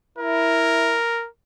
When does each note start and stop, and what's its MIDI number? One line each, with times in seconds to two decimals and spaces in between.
0.18 0.98 64
0.18 1.28 70